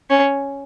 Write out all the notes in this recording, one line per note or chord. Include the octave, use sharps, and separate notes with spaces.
C#4